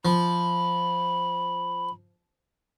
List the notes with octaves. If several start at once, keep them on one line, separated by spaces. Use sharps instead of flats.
F3 B5